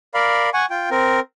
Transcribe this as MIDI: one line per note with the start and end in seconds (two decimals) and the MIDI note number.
0.14 0.49 70
0.14 0.49 74
0.14 0.49 77
0.14 0.49 83
0.54 0.66 78
0.54 0.66 80
0.54 0.66 85
0.70 0.89 65
0.70 0.89 79
0.91 1.20 60
0.91 1.20 70